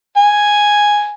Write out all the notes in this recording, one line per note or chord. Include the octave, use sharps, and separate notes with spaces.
G#5